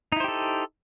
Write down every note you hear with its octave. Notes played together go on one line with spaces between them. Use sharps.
D#4 E4 G4 A4 C5